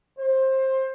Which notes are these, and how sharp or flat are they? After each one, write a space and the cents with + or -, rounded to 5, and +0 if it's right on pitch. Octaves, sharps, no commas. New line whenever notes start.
C5 +20